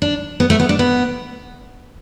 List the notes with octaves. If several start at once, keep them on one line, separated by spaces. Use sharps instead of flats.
D4
B3
A3
B3
D4
B3